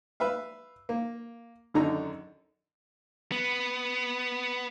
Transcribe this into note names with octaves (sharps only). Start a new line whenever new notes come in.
B4 E5 F5
A#3
G#1 F#2 D3 D#4 A#5
B3